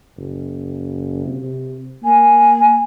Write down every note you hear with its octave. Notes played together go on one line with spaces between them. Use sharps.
F#1
C3
A#3 G#5